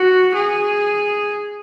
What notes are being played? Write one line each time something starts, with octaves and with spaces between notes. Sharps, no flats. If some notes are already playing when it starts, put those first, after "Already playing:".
Already playing: F#4
G#4